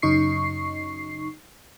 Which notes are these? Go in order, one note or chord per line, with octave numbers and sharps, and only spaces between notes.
F#2 C#3 D#4 C#6 C7